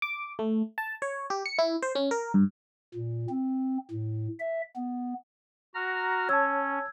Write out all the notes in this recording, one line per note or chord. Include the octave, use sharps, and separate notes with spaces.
D6
A3
A5
C#5
G4
C#7
E4
C5
C#4
A#4
G2
A#2
C4
A2
E5
B3
F#4 A#5 F6
C#4 C#5 A5 E6 G#6